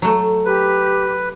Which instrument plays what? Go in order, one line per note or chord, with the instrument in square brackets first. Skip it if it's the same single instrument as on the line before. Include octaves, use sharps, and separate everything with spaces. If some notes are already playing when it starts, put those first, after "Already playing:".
[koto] F#3 A3
[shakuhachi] G4 [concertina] B4